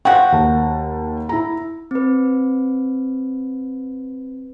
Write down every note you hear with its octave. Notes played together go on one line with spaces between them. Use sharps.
F3 A3 F#4 F#5 G5
D#2 A5
E4 A#5
C4 B4